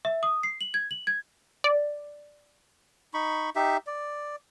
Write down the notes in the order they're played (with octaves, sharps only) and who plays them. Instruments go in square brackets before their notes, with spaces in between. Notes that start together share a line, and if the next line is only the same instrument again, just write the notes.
[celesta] E5
D#6
C7
F#7
G#6
F#7
G#6
[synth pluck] D5
[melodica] D#4 B5 C#6
D#4 G4 E5
D5